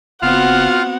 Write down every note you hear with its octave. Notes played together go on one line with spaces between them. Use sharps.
F#1 B3 C4 F4 F#4 F5 F#5 F6